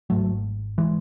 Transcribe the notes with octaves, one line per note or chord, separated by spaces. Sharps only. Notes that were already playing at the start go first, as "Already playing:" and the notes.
G#1 G#2 F#3 A3
E3 G#3